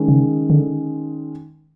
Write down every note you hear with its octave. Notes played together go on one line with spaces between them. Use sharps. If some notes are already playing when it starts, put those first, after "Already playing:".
Already playing: D#3 G#3 C#4
C#3
D3